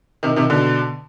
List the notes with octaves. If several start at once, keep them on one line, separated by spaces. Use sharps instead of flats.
C3 D#3
C3 D#3
B2 D3